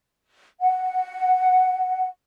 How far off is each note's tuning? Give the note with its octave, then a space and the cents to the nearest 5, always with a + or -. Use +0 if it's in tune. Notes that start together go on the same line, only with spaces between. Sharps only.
F#5 +0